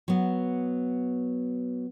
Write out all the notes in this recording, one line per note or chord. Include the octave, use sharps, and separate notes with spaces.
F#3 B3